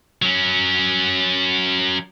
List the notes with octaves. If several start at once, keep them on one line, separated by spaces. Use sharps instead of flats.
F#3 C#4